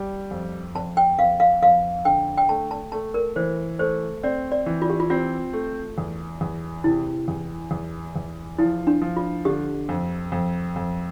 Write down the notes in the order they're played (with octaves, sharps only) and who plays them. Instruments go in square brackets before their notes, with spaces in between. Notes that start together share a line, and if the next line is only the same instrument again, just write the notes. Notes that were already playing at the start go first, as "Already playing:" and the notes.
Already playing: [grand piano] G3
F2
[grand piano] F2 [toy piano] A5
[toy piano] G5
[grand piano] F2 [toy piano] F5
[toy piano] F5
[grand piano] F2 [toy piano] F5
[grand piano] D3 [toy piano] G5
[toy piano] G5
[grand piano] A3 [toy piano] A5
[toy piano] A5
[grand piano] A3 [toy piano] A5
[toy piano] A#4
[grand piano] E3 [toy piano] C5
[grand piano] A3 [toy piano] C5
[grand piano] C4 [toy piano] D5
[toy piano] D5
[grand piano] E3
[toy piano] F4
G4
F4
[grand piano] C4 [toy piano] F4
[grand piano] A3
E2
E2
[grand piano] C3 [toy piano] E4
[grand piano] E2
E2
E2
[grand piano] F3 [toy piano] E4
[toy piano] D4
[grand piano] F3
[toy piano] F4
[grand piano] D3 [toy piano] G4
[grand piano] F2
F2
F2